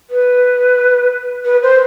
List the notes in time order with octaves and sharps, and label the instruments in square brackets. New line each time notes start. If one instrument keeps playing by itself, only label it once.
[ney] B4
B4
C5